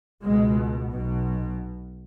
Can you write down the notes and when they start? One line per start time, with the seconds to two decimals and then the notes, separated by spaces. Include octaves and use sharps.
0.22 C#2 B2 G#3
0.89 B1 B2